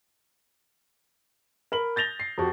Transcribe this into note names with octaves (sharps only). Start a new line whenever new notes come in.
A#4 B5 F#7
G6 A6 A#6 F7 G7
C7
F2 F#4 G4